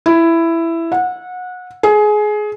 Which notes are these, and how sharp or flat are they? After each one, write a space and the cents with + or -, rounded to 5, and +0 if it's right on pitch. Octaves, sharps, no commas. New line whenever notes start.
E4 +10
F#5 -25
G#4 +20